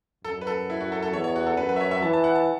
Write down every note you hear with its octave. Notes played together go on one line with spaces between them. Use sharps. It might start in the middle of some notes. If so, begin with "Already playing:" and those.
F#2 A4
B4
A4
E4
F#4
A4
A4
E2 C#5
C#5
F#4
A4
F#2 B4
B4
E5
C#5
E5
E3 A5
A5
F#5
A5